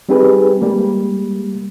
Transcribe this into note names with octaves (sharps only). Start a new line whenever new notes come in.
G3 C4 D#4 G4 G#4 B4
G3 G#3 A#3